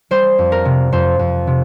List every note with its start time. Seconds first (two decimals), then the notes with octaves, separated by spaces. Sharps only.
0.11 G3 C5
0.38 F2
0.52 A#4
0.65 C3
0.92 F2 C5
1.19 F2
1.47 C3